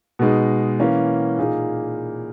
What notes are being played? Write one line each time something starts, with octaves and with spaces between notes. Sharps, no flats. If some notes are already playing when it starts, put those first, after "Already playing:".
B2 G#3 D#4
E3 A#3 C#4
A#2 A#3 D#4 G#4